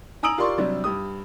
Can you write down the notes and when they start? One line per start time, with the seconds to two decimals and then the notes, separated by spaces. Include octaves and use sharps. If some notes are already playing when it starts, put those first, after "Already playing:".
0.23 G#5 A#5 D#6 E6 D7 F#7
0.38 F4 G4 A#4 D5 C6 C#6
0.58 C3 F#3 G3 D4
0.84 G2 G4 D#6